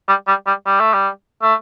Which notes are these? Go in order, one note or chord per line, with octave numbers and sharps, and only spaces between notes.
G3
G3
G3
G3
A3
G3
A3